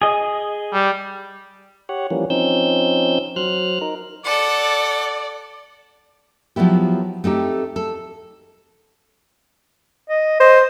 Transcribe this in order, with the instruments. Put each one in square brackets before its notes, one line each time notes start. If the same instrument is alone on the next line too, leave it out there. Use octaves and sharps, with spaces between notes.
[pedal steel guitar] G#4 D#5
[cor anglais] G3
[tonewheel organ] G4 C#5 F#5
E3 F3 G3 A#3 C#4
F3 C4 C#4 D#4 E6 G6
F#3 C5 F6 F#6
D#4 A#4
[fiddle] A4 F#5 [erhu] D5
[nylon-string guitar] F3 F#3 B3 E4 G4
A3 C4 D#4 G4
A4
[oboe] D#5
[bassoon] C5 [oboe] D#5